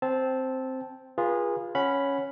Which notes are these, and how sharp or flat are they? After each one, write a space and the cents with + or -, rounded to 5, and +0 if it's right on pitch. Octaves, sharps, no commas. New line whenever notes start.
C4 +0 A5 -10
F4 +0 G#4 -20 B4 -35
C#4 +0 F#5 +0 B5 +0